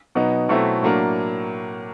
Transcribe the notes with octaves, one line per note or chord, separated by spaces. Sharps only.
B2 F#3 B3 D#4
B2 F#3 A3 C4 E4
A2 F#3 A#3 D4